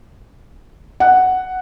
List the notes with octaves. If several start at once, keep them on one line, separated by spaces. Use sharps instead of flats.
F#5